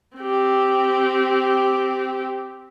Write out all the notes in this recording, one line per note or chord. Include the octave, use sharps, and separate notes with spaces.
C4 G4